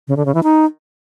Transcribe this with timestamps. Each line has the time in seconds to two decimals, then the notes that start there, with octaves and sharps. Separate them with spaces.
0.08 C#3
0.17 D3
0.26 C#3
0.34 E3
0.43 D#4